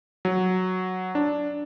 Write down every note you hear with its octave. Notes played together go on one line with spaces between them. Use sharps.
F#3
D4